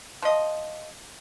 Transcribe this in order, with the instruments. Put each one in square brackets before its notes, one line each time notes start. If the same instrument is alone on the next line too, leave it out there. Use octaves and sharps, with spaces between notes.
[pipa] F3 D#5